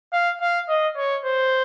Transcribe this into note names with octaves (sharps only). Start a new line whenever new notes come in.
F5
F5
D#5
C#5
C5